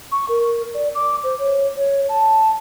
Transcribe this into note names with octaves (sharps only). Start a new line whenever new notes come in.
C#6
A#4
D5
D6
C5
C#5
C#5
A5